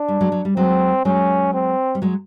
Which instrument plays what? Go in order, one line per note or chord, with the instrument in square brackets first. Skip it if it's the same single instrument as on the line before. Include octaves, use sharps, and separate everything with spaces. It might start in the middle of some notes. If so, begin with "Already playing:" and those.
Already playing: [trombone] D4
[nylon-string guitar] G3
F#3 G#3
F#3
G3
[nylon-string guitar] F#3 G#3 [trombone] C4
[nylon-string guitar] F#3 G#3 [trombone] C#4
[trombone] C4
[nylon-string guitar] G3
F#3 G#3